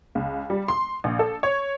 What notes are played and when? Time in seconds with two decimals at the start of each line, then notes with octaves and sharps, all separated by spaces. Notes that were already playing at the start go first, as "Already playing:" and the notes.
0.15 C#2
0.50 G3
0.68 C6
1.04 A#1
1.19 A4
1.43 C#5